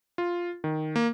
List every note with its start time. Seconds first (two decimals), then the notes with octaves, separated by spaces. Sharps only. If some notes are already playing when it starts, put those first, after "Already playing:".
0.18 F4
0.64 D#3
0.96 A#3